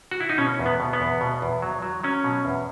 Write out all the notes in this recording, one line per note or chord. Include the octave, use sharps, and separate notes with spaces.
F#4
E4
D#4
B2 C#4
E2
B3
B2
B3
E2
B2
E2
F#3
F#3
F#3 C#4
B2
E2